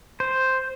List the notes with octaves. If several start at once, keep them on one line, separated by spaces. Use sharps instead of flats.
C5